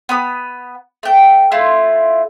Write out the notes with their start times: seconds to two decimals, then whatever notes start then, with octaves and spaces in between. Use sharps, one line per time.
0.09 B3 B5 D#6
1.03 A3 G5
1.52 A3 E4 F4